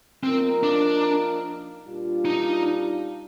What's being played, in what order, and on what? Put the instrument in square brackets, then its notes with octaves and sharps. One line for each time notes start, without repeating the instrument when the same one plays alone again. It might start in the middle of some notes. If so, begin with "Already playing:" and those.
[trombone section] F3 A#3 D#4 A#4 [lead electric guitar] C4
[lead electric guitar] D4
[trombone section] A#2 G3 D4 F4
[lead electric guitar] D#4